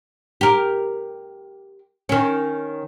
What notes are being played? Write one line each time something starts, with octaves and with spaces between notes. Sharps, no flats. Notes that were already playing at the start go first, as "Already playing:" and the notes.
G4 A#4
D#3 C#4